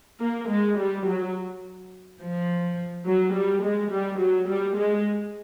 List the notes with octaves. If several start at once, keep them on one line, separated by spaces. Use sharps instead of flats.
A#3
G#3
G3
F#3
F3
F#3
G3
G#3
G3
F#3
G3
G#3